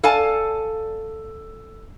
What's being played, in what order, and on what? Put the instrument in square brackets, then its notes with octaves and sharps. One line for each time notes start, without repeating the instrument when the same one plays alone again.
[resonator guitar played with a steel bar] A4 D5 F5 G#5 A5